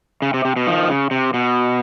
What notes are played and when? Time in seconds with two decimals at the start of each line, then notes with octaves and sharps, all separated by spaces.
0.22 C#3
0.34 C3
0.45 C3
0.56 B2
0.67 D#3 F3
0.89 C#3
1.11 C3
1.34 B2